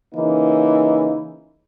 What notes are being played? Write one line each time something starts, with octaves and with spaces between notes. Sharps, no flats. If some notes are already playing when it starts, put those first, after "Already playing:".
C#3 E3 A#3 D#4